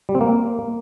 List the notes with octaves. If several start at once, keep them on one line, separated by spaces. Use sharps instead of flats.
G3
C4
A#3